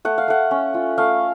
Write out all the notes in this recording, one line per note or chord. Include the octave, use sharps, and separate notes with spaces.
A3 F#5
F5
A3 F#5
C#4
F4
A3 F5